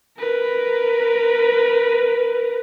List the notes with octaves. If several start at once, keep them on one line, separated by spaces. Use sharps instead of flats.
A#4 B4